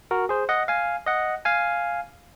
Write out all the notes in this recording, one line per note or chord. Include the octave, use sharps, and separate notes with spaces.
F#4 A#4
G#4 C5
D#5 F#5
F5 G#5
D#5 F#5
F5 G#5